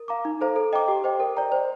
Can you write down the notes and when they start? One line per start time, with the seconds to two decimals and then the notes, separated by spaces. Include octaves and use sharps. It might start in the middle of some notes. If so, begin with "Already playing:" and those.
Already playing: A#4
0.08 F5 A#5 D6
0.25 D#4
0.41 A4 C5 F5 A#5
0.56 A4
0.73 D#5 G5 A#5 D6
0.88 G4
1.04 C5 D#5 G5
1.20 A#4
1.37 D5 G5 A#5
1.52 C5